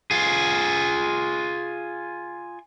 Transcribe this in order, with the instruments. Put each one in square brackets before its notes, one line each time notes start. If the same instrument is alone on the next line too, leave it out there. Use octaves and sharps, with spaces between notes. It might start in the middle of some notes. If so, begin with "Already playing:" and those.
[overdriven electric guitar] F4 G#4